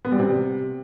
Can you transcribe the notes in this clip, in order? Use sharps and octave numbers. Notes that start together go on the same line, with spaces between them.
B3
G3
C3